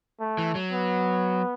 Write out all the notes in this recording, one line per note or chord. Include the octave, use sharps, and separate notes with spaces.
A3
E3
F#3
B3